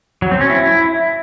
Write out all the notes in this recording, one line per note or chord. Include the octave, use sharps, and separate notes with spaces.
F#3
C4
C#4
E4